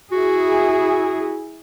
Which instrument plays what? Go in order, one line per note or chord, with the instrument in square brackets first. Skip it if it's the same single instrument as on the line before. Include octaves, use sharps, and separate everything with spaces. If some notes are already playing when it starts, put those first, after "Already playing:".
[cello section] E4 G#4 [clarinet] F#4